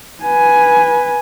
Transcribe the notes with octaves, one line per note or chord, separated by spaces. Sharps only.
B4 G#5